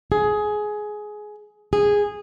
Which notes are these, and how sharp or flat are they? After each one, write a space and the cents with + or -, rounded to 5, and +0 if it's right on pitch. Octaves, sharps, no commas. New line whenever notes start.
G#4 +15
G#4 -10